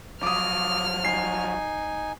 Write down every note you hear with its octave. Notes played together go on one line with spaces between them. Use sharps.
F3 F#3 D6 D#6 F6
D#4 G#5 C7